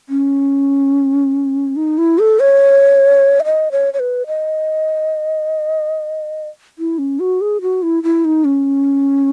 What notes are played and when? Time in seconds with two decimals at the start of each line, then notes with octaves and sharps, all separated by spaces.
0.09 C#4
1.76 D#4
1.98 E4
2.19 A4
2.40 C#5
3.40 E5
3.44 D#5
3.72 C#5
3.94 C#5
3.99 B4
4.27 D#5
6.79 E4
6.99 C#4
7.20 F#4
7.41 G#4
7.61 F#4
7.83 E4
8.03 E4
8.25 D#4
8.45 C#4